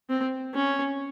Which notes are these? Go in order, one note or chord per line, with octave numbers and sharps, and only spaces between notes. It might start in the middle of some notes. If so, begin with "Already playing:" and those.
C4
C#4